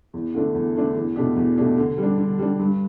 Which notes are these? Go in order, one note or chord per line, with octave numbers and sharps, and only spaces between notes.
E2
D3 A3 D4
E2
D3 A3 D4
E2
B2 A3 D4 G4
E2
B2 A3 D4 G4
D3
G3 D4
D3
G3 D4
G2